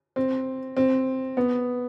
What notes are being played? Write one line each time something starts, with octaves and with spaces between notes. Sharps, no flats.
C4
C4
B3